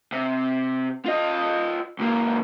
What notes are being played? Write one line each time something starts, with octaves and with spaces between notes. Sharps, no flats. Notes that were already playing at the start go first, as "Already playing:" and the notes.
C3
F4 D#5
C#2 A#3